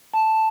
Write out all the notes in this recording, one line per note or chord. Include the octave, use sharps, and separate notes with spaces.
A5